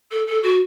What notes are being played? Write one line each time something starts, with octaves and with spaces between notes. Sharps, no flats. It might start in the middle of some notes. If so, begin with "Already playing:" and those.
A4
A4
F#4